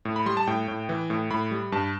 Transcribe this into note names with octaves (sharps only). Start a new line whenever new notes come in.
A2
B5
G3 C6
A5
A2 G5
A2
E3
A2
A2 B5
G3
G2 A5